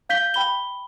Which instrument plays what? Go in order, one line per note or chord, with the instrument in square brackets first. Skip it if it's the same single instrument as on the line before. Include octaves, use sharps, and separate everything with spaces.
[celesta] F5 G6 B6 G7
G5 B5 G7